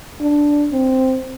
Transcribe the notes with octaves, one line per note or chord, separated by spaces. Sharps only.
D4
C4